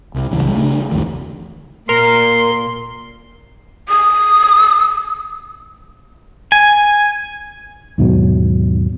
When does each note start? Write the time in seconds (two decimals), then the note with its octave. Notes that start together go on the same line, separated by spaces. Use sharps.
0.14 C2
0.31 D1 A#1 C#3 E3
0.43 C2 D3 F3 G3
0.55 C#3 A3 D4
0.92 C2 F2 D#3 E3
1.89 A#2 A#4 C6
3.89 D#6
6.52 G#5
7.98 D#2 G#2 B2 F#3